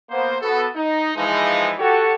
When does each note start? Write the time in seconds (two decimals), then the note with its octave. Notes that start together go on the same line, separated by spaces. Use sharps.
0.10 A#3 B3 C5
0.41 B3 F#4 A4
0.76 D#4
1.16 E3 F3 G#3 D#4
1.79 F#4 G4 A4 C#5